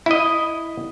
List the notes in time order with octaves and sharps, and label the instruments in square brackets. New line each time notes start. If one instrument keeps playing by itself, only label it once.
[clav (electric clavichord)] E4 D#5